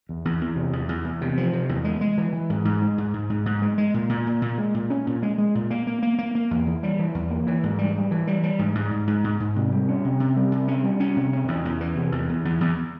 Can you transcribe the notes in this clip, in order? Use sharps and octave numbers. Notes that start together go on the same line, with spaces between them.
E2
E2
E2
C3
E2
E2
E2
C3
F3
C3
E2
G#3
G#3
E3
E3
G#2
G#2
G#3
G#2
G#2
G#2
G#2
G#3
G#3
A#2
A#2
A#2
A#2
G#3
A#2
C#4
A#2
G#3
G#3
A#2
A#3
A#3
A#3
A#3
A#3
E2
E3
G3
E3
E2
A#3
E3
G#2
G3
G3
E3
G3
G3
G#2
G#2
G#2
G#2
G#2
G#2
C3
G3
C#4
C3
C3
G3
C3
C#4
G3
C#4
C3
C#4
E2
E2
E3
C3
E2
E2
E2
E2